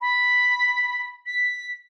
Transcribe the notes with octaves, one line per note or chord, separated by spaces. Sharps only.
B5
B6